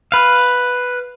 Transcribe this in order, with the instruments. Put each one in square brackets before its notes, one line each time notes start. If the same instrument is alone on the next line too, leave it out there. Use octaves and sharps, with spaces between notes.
[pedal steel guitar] B4 F5